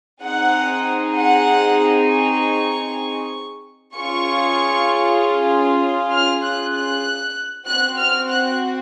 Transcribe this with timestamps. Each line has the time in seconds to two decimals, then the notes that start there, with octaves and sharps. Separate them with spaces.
0.23 C4 D#4 G#4 F#5
1.16 F#5
2.09 C#6
3.95 C#4 F4 G#4 C#6
6.12 F6
6.43 F#6
6.74 F#6
7.67 C4 F#4 F#6
7.98 F6
8.29 F#6